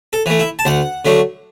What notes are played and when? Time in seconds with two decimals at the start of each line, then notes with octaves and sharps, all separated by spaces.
0.13 A4
0.26 E3 A3
0.39 E4
0.59 A5
0.65 D2 F#5
1.05 D3 F#3 A3